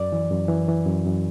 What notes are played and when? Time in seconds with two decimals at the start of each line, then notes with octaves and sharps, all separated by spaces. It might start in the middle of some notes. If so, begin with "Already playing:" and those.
Already playing: F#2 D5
0.12 E3
0.31 F#2
0.48 E3
0.68 E3
0.86 F#2
1.05 F#2